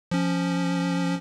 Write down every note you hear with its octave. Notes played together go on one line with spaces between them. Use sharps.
F3 C#4